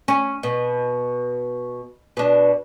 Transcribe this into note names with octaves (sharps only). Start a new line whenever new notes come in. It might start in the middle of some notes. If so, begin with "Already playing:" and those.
C#4
B2
B2 D4